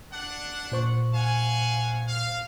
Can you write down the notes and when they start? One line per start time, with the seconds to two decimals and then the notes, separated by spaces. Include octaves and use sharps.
0.13 D4 F#5
0.72 A#2 C5 C#6
1.14 F5 F#5 G#5
2.08 F5